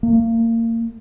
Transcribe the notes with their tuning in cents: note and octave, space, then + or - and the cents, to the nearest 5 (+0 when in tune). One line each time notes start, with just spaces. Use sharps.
A#3 -30